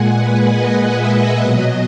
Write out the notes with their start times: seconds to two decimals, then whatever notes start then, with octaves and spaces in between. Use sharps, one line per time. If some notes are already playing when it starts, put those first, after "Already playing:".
Already playing: A#2 G#3 F#5 G#5
0.16 B4
0.48 D#5
0.94 E5
1.39 B2 F#3 D#5